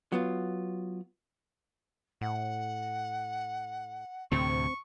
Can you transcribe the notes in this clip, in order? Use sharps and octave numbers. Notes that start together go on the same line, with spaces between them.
F#3 B3 F4
A2 F#5
D2 A2 C3 C4 C#6